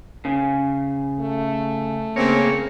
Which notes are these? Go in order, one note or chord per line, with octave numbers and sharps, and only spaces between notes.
C#3
A3
C#3 A#3 C4 C#5